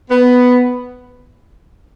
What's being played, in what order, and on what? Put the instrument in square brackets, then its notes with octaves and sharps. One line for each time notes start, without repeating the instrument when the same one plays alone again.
[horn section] B3